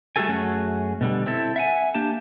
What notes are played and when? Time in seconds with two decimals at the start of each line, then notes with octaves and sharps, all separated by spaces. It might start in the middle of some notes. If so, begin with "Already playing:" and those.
0.16 G3 A3 F#4 G#4 A4 G#5
0.28 F#2 A3 C#4 F#4 G#4
1.01 B2 D3 G3
1.26 C4 E4 A4
1.56 E5 F#5 G#5
1.94 A#3 D4 G4 A5